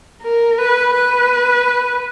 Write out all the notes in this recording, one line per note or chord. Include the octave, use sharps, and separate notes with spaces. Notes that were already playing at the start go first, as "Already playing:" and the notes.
A#4
B4
B4